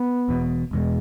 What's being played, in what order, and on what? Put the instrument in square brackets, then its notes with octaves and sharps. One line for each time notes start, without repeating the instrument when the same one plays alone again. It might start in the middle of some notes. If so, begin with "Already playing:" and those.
Already playing: [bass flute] B3
[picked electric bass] E1 E2 B2
[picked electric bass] E1 E2 B2 [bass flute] G#3